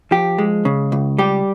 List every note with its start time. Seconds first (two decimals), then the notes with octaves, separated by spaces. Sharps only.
0.11 F3 G4
0.38 G#3
0.65 C#3
0.92 C#2
1.18 G3 G4